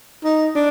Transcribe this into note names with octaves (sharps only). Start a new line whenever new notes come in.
D#4
D4